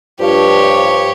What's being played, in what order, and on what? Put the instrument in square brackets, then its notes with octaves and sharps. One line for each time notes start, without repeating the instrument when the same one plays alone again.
[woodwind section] G2 F3 [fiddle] G4 C#5